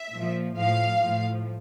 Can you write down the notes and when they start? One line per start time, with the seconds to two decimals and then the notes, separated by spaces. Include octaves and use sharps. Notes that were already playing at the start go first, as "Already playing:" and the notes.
Already playing: E5
0.12 A#2 F3
0.57 A2 F3 F5
1.02 A2 F3